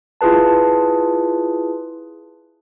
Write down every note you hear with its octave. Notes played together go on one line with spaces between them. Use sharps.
E4 F4 G#4 B4 A5